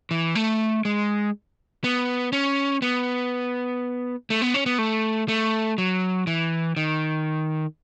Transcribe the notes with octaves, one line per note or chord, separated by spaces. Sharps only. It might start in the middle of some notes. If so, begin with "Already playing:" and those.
E3
A3
G#3
B3
C#4
B3
A3
B3
C#4
B3
A3
A3
F#3
E3
D#3